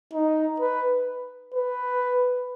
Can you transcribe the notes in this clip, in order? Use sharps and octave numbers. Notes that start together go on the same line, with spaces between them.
D#4
B4
B4